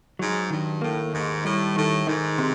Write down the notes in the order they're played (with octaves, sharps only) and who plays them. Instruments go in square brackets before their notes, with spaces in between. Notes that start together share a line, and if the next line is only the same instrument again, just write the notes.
[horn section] G#2 [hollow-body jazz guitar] F#3
[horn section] G2 [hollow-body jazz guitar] D#3
[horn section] A2 [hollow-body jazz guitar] A#3
[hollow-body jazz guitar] D#2 [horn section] G#2
[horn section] A2 [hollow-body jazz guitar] G3
[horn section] A2 [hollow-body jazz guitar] D#3
[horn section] G#2 [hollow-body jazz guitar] D#3
[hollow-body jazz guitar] C3